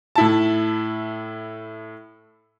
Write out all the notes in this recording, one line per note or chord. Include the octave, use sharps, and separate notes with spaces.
A2 E4 A5